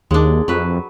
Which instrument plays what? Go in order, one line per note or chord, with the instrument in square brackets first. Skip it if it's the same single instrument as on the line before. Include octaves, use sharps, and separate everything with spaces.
[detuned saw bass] D#2 [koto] G#3 D4
[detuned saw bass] F2 [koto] F#3 B4